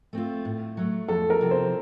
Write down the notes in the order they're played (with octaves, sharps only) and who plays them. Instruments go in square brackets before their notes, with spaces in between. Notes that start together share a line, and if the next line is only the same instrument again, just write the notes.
[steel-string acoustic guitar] A3 C4 F4
A2
F#3 A3
[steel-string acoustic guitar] F2 [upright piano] A4
[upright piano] A#4
[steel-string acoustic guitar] C3 F3
[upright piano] C5